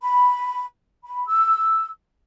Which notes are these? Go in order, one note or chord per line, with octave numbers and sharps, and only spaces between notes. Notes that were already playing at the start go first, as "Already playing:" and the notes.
B5
B5
E6